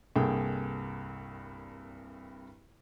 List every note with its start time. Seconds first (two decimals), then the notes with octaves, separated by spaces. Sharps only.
0.16 C2 G2 A#3 G#4 A4 G5